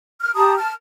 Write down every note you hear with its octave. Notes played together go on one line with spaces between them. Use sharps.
F6
G4 A5 A#5 D#6
A5 F6